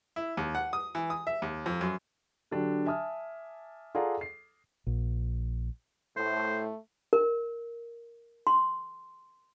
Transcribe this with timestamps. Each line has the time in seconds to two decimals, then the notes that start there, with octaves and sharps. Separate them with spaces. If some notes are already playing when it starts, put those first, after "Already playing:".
0.16 E4
0.37 D#2
0.55 F#5
0.73 D#6
0.95 E3
1.10 D#6
1.27 E5
1.42 D#2
1.66 F2
1.81 F#2
2.51 D3 F#3 D4 G4
2.86 E5 G#5 A5 D#6 F6
3.95 F4 G#4 A4 D5 F#5 A#5
4.21 C7
4.87 A#1
6.17 A2 A3 C5
7.13 A#4
8.47 C6